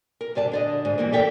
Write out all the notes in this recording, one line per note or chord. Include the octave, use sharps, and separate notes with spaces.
A#4
G2 D3 D5 G#5 A5
D3 D5 D#5
G#2
B2 E3 G3 A#3
G4 A4 A#4 D5 E5 G5